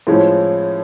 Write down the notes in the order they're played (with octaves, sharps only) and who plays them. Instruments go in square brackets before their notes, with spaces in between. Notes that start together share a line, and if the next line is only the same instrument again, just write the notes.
[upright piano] A2 F3 G#3 C#4